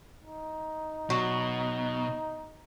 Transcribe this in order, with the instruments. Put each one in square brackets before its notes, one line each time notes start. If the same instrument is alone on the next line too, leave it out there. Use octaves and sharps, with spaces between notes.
[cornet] D#4
[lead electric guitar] B2 [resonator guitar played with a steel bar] F#3